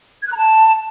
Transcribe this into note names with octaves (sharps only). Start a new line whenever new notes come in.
G#6
F#6
A#5
A5